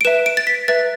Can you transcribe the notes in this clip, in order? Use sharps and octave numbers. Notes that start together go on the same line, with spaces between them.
D7
B4 E5 E7
D7
A6
B6
B4 E5 A6